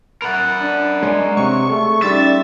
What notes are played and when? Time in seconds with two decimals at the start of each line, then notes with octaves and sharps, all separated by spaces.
0.22 A#4 F#5 B5 A6
0.61 D4
1.03 G#3 C#5 D5
1.37 C3 C#6
1.69 A3 G#4
2.02 G3 C#4 D#4 E5 C6 A6